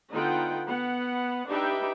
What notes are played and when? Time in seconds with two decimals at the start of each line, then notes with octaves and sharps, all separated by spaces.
0.11 D3 B3 D#4 F4 F#5 G5
0.67 B3 F#5
1.48 D4 D#4 G4 B4 E5 G5